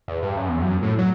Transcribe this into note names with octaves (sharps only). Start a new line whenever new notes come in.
E2
G2
F#2
E2
F#2
A2
F#3